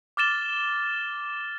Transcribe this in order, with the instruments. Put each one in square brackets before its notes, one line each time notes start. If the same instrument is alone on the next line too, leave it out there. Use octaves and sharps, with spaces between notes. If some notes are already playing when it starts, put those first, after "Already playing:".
[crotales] D6 F6 A6 E7 G7